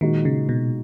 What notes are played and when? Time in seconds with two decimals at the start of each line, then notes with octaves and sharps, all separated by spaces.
0.01 A#2 D#3 G#3 D#4 F#4
0.25 C#3
0.49 B2